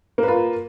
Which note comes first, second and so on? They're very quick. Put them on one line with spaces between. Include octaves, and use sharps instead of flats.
A#3 B4 F4